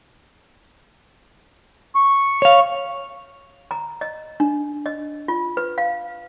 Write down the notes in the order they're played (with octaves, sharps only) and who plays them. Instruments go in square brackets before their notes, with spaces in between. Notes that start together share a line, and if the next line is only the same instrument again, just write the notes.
[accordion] C#6
[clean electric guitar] C#5 F5
[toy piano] A#5
D#5
D4
D#5
F4
B4
F5